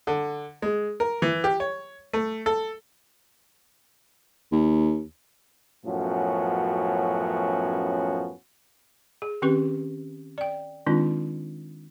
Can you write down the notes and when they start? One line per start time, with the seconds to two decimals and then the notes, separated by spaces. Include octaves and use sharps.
0.07 D3
0.62 G#3
1.00 A#4
1.22 E3
1.44 G4
1.60 C#5
2.13 A3
2.46 A4
4.52 D#2
5.86 F#2 A2 F3 B3 C#4 F#4
9.22 G#4
9.42 D#3 C4 C#4 G4 B4 C#6
10.38 D5 G5
10.86 D#3 G#3 C4 D4 D#4 F4